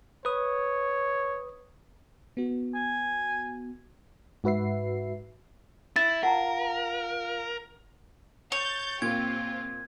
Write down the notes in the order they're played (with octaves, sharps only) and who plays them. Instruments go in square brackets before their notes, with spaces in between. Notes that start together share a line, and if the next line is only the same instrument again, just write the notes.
[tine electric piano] B4 D#6 [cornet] C#5
[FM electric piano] B3 F#4
[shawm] G#5
[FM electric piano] G#2 F#4 B4 E5 C7
[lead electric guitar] E4 [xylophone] A6
[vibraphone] F4 F5 [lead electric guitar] A#4 [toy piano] F#5 A5 A#5
[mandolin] C#5 [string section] G6 A6
[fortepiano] A#2 [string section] C4 F4 G4 [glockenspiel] G#6